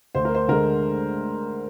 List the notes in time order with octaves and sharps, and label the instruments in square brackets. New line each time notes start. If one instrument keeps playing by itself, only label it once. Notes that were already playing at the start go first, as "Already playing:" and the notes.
[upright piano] D2 C5
A#4
C5
D3 G#3 A#4